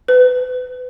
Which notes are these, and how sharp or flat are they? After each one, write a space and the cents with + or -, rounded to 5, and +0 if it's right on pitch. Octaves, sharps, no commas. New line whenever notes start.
B4 +30